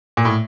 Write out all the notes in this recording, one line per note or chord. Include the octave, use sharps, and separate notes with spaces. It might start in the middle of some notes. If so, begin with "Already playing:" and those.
A#2
A2